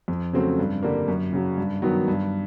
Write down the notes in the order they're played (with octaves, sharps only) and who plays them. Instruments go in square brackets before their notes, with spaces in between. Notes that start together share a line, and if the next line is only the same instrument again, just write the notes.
[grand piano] F2
C#3 F#3 A3 C4
G2
D3 G3 A#3
F#2
C#3 F#3
G2
D#3 F#3 B3
G2